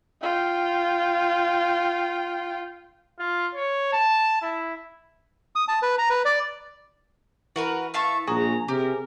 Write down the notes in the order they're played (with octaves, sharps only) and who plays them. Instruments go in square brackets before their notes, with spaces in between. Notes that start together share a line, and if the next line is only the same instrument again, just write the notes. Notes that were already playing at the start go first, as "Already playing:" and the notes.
[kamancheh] F4 G5
[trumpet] F4
C#5
A5
E4
[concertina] D#6
A5
B4
A#5
B4
D5
[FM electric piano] E3 [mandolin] F#4 A#4 B4
[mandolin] E5 F5 A5 [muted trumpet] C#6
[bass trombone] A#1 [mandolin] F#4 [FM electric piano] G#4 [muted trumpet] A#5
[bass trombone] C3 [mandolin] G4 [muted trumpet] A#4